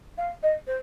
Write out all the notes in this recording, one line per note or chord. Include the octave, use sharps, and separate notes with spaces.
F5
D#5
C5